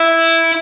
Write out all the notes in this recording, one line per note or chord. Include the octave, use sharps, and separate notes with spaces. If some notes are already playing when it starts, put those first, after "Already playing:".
Already playing: E4